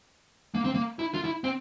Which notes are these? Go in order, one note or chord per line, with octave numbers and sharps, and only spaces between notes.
A#3
C4
A#3
E4
F4
E4
C4